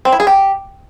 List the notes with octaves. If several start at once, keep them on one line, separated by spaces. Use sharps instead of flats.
C4
E4
G#4
G4